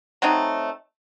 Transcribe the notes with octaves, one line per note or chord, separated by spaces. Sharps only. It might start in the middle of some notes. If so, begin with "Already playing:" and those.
F#3 A3 C4 D#4